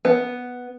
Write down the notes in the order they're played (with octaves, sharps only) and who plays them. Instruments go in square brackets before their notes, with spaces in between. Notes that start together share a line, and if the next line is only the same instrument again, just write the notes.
[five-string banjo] B3